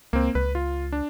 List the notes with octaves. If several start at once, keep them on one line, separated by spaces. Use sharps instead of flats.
C#2 A#3 C4
C#2 B4
F4
D4